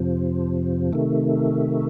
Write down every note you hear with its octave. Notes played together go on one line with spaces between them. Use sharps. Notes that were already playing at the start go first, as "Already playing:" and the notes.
Already playing: F2 C3 F3
C3 D#3 A3